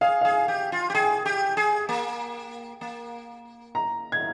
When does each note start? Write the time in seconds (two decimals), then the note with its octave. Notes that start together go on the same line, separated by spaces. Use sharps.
0.01 G#4 F5
0.21 G#4 F5
0.48 G4
0.72 F4
0.90 G4
0.94 G#4 G5
1.26 G4
1.57 G#4
1.89 A#3
2.81 A#3
3.75 A#5
4.12 G#6